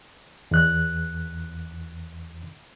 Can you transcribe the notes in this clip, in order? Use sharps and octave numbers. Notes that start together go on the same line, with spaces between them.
E2 F#6